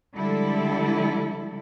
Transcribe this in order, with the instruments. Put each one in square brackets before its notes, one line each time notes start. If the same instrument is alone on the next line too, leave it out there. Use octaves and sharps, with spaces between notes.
[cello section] D3 F3 G3 G#3 E4 A4